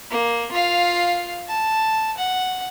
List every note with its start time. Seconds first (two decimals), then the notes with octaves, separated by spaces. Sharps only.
0.11 A#3
0.52 F4 F5
1.48 A5
2.17 F#5